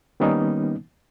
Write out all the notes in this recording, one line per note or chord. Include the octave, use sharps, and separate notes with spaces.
D#3 G3 A#3 B3 C#4 D#4